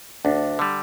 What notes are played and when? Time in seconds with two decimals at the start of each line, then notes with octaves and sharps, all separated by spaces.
0.25 D2 D4
0.59 D3 G3